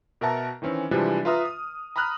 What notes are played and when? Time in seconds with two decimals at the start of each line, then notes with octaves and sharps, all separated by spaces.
0.21 B2 A#4 E5 F#5 A5 A#5
0.62 D#3 E3 C4 C#4
0.91 C3 E3 F3 G3 G#3 D4
1.25 F4 B4 E5 A#5 D#6 F6
1.45 D#6
1.96 A#5 B5 D#6 F6 F#6